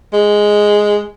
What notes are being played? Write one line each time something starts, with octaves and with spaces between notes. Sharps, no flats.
G#3